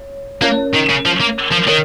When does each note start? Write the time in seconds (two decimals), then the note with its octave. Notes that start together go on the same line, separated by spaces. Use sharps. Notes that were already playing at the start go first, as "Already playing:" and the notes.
Already playing: C#5
0.42 A#3 C#4 A#4 C#5
0.74 D#3
0.89 C#3
1.05 F3
1.21 A#3
1.52 F3
1.68 D#3 A#4 C#5